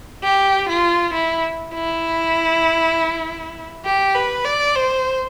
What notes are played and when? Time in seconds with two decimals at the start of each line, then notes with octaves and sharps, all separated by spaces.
0.23 G4
0.69 F4
1.14 E4
1.74 E4
3.85 G4
4.15 B4
4.45 D5
4.75 C5